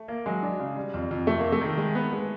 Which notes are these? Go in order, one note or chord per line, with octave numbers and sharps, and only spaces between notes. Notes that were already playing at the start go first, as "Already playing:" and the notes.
Already playing: A3
A#3
F#3 G#3
D4
C#3
G3
F2
F2
C3 A3
C3 A#3
A3
D#3
G#3
B3
G#3